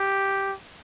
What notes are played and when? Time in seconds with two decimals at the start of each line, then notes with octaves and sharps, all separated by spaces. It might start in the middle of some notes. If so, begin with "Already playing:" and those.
Already playing: G4